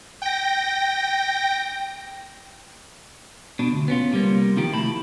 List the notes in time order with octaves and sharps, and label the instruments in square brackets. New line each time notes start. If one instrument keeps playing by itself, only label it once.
[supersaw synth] G5 A#6
[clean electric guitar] B2 D4
D2
B3 C#4 F4
C3 G3 A#3
C3 D#3 F3 F4 G4
A3 E4 A5 B5